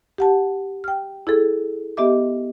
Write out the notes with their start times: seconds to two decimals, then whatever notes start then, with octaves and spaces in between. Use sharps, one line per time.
0.18 G4 F#5 A5
0.84 G5 F6
1.27 E4 G#4 A4
1.97 B3 G4 D#5 E5 D6